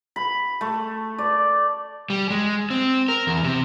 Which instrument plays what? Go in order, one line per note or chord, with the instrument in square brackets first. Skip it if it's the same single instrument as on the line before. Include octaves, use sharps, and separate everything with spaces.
[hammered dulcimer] B5
A3
D5
[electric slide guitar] G3
G#3
C4
A#4
E2
C3